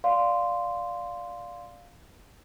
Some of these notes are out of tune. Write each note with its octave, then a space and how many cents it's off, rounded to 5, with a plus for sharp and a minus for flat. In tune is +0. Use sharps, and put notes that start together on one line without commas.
D5 +0 F5 +5 C6 -10